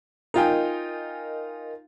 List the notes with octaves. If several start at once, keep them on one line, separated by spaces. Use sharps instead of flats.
D#4 F4 A#4 D#5 G5 G#5